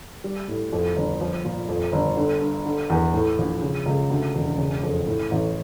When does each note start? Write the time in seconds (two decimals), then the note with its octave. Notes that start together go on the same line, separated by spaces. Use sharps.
0.24 G3
0.48 A2
0.73 F2
0.96 G1
1.21 F3
1.45 A#2
1.69 F2
1.92 G1
2.17 D3
2.41 G2
2.65 D3
2.90 E2
3.14 A2
3.38 A#1
3.62 C#3
3.86 C#2
4.10 D2
4.35 E1
4.58 C#3
4.83 F2
5.07 A2
5.31 A1